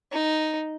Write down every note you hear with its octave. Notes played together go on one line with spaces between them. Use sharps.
D#4